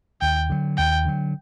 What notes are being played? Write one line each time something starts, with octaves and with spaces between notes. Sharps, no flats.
D#2 G5
D3 F#3
D#2 G5
D3 F#3